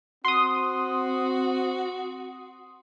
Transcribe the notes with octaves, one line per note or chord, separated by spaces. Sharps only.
C4 F#4 C6 D#6